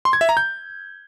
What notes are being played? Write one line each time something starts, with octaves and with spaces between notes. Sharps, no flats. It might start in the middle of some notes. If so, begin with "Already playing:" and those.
C6
G#6
E5
A#5
G6